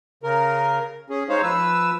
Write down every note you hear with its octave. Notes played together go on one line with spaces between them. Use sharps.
C#3 A#4
C#4 G#4
G#3 D#4 C5 C#5 F5
F3 B4 E6